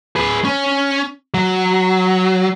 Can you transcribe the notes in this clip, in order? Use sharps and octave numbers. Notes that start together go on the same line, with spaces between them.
G#4 B4
C#4
F#3